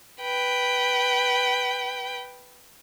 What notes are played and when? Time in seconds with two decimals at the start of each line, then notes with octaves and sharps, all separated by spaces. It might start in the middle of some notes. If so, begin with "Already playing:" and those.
0.22 B4 G5